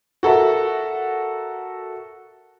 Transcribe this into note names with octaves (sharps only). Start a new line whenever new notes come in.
F#4 A4 A#4 E5